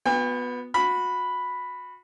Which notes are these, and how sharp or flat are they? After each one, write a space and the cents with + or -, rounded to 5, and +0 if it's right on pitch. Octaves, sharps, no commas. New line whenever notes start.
B3 +0 F#4 -45 G5 +40
F#4 -30 B5 +0